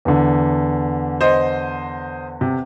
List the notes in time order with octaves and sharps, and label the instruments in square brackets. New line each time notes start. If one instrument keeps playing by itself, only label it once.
[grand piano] E2 D3
[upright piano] C5 D#5
C3